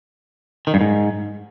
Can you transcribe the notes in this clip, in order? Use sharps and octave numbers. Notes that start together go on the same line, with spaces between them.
D#3
G2
G#2